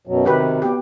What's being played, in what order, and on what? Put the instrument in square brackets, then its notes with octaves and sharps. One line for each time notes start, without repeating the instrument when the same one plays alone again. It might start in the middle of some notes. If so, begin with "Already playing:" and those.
[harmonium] F#2 B2 F#3
[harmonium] C3 D#3 [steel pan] F#4 G4 B4
[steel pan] B3 G4